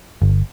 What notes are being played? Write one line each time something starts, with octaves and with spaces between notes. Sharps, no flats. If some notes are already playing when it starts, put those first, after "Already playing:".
G1